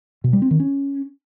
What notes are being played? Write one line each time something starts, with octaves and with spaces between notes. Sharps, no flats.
B2
G3
C4
D#3
C#4